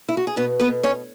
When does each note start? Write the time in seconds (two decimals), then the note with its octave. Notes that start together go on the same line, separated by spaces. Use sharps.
0.09 E4
0.17 F#4
0.27 G#4
0.36 B2 B3 B4
0.60 B3 B4
0.68 B2
0.83 C#4 C#5